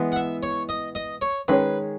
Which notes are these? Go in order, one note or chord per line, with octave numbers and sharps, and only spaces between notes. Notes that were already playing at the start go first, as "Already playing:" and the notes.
Already playing: E3 G#3 B3
F#5
E5
C#5
D#5
D#5
C#5
D#3 G#3 C#4 G#4 B4 C#5